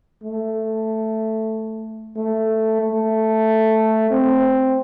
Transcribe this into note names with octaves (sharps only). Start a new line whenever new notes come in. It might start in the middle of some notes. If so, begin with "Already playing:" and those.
A3
A3
A3
C4